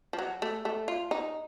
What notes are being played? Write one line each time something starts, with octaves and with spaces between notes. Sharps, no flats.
F3
F#3
A3
A3
F4
D#4